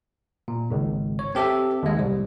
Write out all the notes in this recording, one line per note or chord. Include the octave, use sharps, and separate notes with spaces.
A#2
G#1 C#2
C#5
C4 G4 A4 E5
D#2 G#3
C2 A2 G3